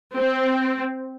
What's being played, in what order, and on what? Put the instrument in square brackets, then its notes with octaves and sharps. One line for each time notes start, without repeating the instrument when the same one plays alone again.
[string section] C4